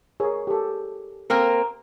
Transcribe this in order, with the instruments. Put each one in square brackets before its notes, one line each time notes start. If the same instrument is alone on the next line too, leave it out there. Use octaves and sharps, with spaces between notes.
[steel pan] G#4 A#4 C#5
G4 A4
[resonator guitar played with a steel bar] A#3 C4 A#4